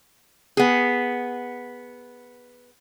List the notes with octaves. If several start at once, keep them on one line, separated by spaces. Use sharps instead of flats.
B3 G#4